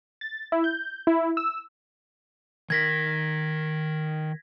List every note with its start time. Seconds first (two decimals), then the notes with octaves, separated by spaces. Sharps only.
0.21 A6
0.52 E4
0.64 G6
1.07 E4
1.37 E6
2.70 D#3 A#4 G#6 A#6 B6